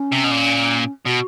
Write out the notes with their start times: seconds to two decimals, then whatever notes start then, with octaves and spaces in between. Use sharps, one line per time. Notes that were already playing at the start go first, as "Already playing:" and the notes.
Already playing: C#4
0.12 C3
0.24 B2
0.31 A#2
1.06 B2 F#4